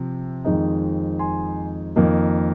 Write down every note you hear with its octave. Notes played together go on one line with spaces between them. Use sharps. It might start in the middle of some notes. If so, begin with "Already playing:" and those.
Already playing: C3 F3 C4
F2 D#3 G#3 C4 D#4
G#5 C6
F2 D#3 A#3 D#4